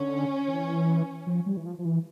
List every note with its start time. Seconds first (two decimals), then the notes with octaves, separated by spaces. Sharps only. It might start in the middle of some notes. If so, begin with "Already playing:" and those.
Already playing: D3 C#4
0.48 E3
1.27 F3
1.46 G3
1.57 E3
1.66 F3
1.79 F3
1.85 E3